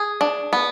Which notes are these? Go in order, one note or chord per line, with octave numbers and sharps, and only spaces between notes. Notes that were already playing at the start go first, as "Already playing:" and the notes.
Already playing: G#4
D4
B3